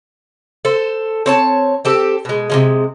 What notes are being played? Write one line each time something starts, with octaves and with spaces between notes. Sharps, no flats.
A4 C5
C4 C#5 A5
C4 G4 A4
B2 G#3
C3 F3 G#3